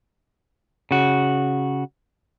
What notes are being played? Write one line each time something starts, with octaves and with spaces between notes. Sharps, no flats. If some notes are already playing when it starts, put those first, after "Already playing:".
C#3 F#4